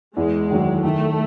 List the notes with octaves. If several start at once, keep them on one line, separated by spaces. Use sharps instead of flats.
E2 G#3
D#3 F#3
D#3 A3